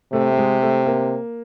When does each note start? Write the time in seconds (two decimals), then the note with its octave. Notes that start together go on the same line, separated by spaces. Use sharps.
0.13 C3 A3
0.31 A3
0.38 G#3
0.62 A3
0.86 A#3